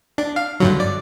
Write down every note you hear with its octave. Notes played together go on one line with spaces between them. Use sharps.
D4
F5
G2 D3 F#3
D5